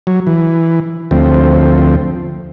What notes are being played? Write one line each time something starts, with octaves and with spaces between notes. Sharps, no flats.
F#3
E3
D2 F3 C4